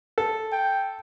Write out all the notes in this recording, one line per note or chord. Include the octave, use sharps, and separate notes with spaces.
A4
G5